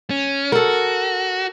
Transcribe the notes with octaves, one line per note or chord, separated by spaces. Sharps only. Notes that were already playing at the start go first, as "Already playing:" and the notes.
C#4
F#4 A4 A#4